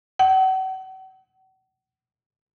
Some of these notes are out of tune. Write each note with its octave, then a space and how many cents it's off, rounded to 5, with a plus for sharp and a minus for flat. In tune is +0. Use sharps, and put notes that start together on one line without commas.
F#5 +40